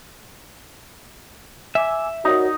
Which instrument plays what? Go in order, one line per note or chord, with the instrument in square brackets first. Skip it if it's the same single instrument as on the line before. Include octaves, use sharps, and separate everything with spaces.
[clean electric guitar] E5 [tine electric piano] G#5 D6 E6
[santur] D#4 [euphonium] F#4 [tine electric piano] A#4 C#5 D5